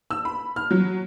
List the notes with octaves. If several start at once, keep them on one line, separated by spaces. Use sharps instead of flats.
E6
B5
F6
F#3